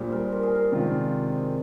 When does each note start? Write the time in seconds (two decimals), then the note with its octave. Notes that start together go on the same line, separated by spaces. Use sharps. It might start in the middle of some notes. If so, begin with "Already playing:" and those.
Already playing: A#2 G3 D4 G#4 C5 D5
0.12 A#4
0.32 A#4
0.43 G#4
0.55 A#4
0.72 C3 D#3 G#3 D4 F4